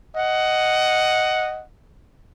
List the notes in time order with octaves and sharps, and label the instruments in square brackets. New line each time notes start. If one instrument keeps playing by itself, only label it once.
[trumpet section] D#5 F#5